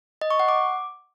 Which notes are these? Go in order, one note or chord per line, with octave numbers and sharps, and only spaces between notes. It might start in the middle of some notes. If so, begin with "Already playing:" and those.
D#5
C#6
F#5
D6